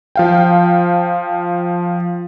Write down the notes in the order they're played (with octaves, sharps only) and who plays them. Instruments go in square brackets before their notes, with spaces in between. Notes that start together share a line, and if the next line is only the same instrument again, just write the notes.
[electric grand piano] F3 F5 G5